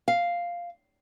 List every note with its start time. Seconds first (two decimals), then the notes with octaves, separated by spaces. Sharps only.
0.08 F5